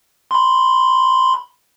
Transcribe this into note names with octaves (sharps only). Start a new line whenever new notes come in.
B5 C6